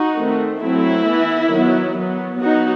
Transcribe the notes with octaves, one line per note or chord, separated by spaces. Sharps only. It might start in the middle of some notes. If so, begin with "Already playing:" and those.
Already playing: D#4 F#4
D#3 A3 C4
F#3 A3 C4 E4
E3 B3
D#3 F#3 B3
F#3 B3
F#3 B3 D#4 F#4